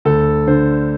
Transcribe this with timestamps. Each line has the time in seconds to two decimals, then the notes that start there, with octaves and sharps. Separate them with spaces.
0.05 D2 A4
0.47 D3 C5